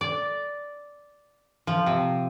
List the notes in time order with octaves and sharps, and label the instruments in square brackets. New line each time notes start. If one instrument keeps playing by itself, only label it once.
[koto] D5
F3
C3